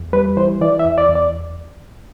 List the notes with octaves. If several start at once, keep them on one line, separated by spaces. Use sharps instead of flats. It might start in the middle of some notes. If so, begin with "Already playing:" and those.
Already playing: E2
G3 B4
E3 C5
E3 D5
E5
E2
D5
E2
D5